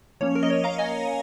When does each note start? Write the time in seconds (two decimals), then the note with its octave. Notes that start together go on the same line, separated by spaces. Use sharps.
0.21 F3 A#3 C#4 C#5
0.35 A#4
0.43 D#5
0.50 C#5
0.64 F5 A#5
0.78 D#5 G#5